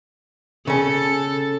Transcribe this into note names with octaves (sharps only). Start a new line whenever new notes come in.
C#3 C#4 A4